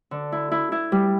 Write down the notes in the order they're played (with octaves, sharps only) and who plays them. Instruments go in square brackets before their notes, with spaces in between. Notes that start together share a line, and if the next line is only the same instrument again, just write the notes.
[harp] D3
E4
E4
E4
G3